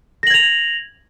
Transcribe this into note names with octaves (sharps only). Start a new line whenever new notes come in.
G#6 A#6 F7 F#7